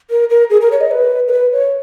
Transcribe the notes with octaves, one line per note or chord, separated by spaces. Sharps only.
A#4
A#4
G#4
A#4
C#5
D#5
B4
A#4
B4
C#5